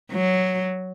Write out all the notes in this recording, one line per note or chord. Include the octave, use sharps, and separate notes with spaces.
F#3